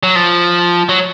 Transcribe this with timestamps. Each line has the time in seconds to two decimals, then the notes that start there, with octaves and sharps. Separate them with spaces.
0.03 F#3
0.15 F3
0.89 F#3